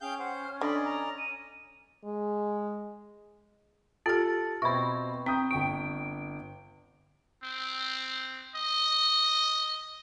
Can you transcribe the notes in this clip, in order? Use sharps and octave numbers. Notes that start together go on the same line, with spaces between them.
C#4 G#4 F5 G5 G6
C5 F#5
F6
D3 D5 D#5 B5
A#5
D#7
G#3
F4 G4 A4 A6
B2 C4 E5 B5 C#6
C4 G5 D#6 G6
G1 G5 C#6 D7
C4
D#5